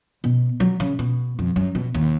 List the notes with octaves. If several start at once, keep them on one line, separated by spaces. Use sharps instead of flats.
B2
F#3
C#3
B2
F2
F#2
B2
D#2